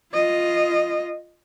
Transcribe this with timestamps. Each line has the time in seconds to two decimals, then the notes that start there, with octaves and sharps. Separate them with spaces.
0.13 F4 D#5